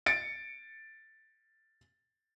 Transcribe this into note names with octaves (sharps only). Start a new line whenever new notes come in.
A6 C#7 D7